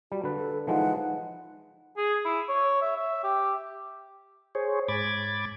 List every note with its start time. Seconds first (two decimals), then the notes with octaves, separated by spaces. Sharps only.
0.12 G3 F#4
0.24 D3 B4
0.37 A4
0.67 E3 F3 G#3 D#4 F#5
1.97 G#4
2.25 E4
2.49 C#5
2.82 E5
2.96 E5
3.23 G4
4.55 G#4 C5 C#5
4.88 G#2 B5 D6 G#6 A6